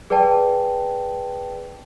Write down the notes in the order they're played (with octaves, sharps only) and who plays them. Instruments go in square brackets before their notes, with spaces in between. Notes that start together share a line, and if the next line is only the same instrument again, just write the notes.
[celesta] G#4 B4 D5 G5 A5